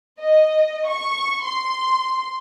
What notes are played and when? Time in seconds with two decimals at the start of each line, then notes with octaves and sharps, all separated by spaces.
0.20 D#5
0.89 C#6
1.44 C6